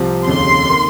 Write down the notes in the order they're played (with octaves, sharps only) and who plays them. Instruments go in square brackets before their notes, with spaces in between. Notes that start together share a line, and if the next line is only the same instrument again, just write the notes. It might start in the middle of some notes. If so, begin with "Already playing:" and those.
Already playing: [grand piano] C2 C3 F3 C4
[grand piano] F1 D#2 C#3 [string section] C6
[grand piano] D#3 A#3